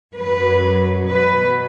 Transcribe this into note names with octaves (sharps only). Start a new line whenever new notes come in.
F#2 F#3 B4
B2 F#3 B4